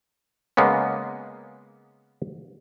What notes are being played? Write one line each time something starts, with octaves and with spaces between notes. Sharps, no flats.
C#3 G#3 A#3 B3 C#4